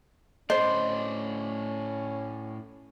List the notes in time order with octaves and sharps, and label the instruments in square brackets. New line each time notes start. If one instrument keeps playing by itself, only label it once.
[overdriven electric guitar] A2 D4 [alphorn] C#4 [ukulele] C5 [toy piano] D#5